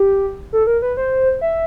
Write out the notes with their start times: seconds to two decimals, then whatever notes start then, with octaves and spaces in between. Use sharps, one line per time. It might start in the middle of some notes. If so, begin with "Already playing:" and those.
Already playing: G4
0.53 A4
0.67 A#4
0.82 B4
0.97 C5
1.41 E5